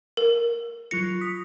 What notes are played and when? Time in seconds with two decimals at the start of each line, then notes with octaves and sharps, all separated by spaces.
0.17 A#4
0.91 F#3 F4 A#6 C#7
1.21 D#6 B6